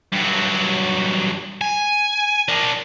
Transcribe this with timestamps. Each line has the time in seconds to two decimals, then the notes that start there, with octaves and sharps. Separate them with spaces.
0.12 G2 F#3
1.61 G#5
2.48 D4 A#4